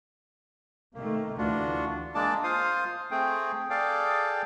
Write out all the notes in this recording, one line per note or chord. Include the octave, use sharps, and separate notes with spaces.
C3 D#3 A3 A#3
D2 E3 D4 F4 F#4
G#3 A#3 D4 D5 A5
F4 C5 F5 D#6
A3 C4 G#4 G5
G#4 A4 D5 F5 G5